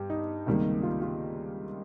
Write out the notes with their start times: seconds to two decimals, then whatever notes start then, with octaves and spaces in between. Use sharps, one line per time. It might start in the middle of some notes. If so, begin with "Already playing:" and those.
Already playing: G2 G4
0.10 D#4
0.46 C#2 C3 D#3 G3 A#3
0.83 F4
1.02 F4